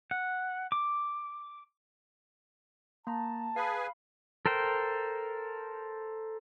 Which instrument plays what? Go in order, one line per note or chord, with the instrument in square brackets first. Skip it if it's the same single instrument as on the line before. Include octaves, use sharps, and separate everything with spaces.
[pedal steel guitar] F#5
D6
[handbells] A#3 A#5 [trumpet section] A5
[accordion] G#4 B4 G#5 [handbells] F5 B5
[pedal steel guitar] A4 A#4 C5 G5